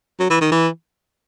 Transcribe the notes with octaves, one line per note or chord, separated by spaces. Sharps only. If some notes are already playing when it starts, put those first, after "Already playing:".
F#3
E3
D#3
E3